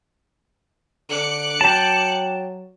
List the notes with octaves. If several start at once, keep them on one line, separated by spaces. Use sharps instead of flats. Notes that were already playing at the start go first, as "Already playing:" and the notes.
D3 D6 F#6 C#7
F#3 G5 A5